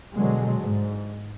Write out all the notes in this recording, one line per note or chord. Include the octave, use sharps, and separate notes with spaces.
B2 D3 F#3 G#3
G#2